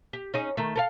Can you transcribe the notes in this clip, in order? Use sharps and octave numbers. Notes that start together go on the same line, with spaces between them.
G4
C#4 D#4 G#4
D#3 A3
A4 A#4 F5